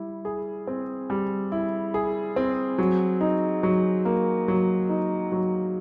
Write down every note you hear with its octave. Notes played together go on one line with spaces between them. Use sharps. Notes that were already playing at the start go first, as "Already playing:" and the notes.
Already playing: G3 E4
G#4
C4
G3
E4
G#4
C4
F#3
D#4
F#3
A#3
F#3
D#4
F#3